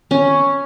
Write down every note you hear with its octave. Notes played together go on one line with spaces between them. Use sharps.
C#4